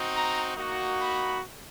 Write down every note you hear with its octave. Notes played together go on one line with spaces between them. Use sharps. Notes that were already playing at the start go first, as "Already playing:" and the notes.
Already playing: C4 D#4 F#4
A#5
A#3 D#4 F#4
B5